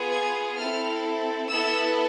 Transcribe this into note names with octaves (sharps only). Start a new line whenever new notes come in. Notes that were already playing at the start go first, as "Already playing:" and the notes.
Already playing: B3 F4 G#4
G#6
C4 E4 A4 F6
B3 E4 A4 E6